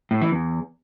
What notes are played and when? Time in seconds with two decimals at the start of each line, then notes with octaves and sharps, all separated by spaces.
0.11 A2
0.22 E3
0.32 E2